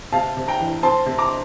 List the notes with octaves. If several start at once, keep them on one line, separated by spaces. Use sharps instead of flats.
C3 F5 A5
C3
G5 A#5
E3
C4 A5 C6
C3
A#5 D6